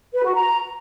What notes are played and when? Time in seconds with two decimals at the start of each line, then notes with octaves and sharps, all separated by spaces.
0.13 B4
0.24 F#4
0.34 A#5